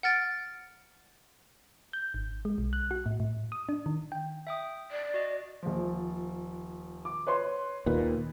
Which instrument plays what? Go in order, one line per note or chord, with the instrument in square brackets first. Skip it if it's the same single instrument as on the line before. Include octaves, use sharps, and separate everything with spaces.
[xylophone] F#5 F6 A6 D7
[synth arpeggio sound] G6
G#1
G#3
B1
F#6
F#4
A2
A2
D#6
D4
D#3
G5
[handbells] E5 G5 D#6
[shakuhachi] D5
[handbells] F#4 D#5
[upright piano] D#1 F3
D6
B4 C#5 C6
[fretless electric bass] D#2 A#2 [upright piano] B4